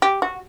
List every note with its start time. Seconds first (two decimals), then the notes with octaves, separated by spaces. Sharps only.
0.02 G4
0.22 F#4